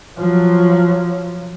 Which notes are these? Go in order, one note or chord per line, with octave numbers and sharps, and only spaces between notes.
F3 F#3